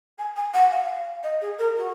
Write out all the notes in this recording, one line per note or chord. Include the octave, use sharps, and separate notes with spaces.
G#5
G#5
F#5
F5
D#5
G#4
A#4
F#4